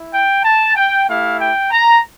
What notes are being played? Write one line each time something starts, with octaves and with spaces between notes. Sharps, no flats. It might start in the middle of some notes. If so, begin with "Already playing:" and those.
Already playing: E4
G5
A5
G5
A3 E4 G4 F5
G5
A#5